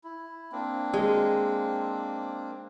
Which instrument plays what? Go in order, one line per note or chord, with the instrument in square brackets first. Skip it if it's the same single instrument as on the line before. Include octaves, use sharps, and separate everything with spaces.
[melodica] E4
A#3 C4 D4
[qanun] G#3